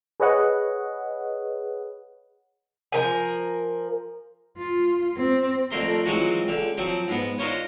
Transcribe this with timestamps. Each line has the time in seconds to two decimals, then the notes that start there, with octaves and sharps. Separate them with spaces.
0.20 G#4 B4 C#5 D#5 F#5
2.92 F3 A#4 G#5
4.58 F4
5.17 C4
5.71 F2 D3 A3 A#4 C6
6.06 E3 F#3 G#3 C4 F4 F#4
6.48 C#2 D3
6.78 F3 F#3 C4
7.08 G#2 B3
7.39 D4 D#4 F4 A#4 C5 C#5